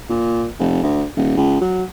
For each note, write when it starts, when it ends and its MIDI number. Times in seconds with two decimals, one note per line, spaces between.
0.10 0.46 46
0.59 0.83 29
0.83 1.04 38
1.17 1.35 27
1.37 1.61 37
1.61 1.84 54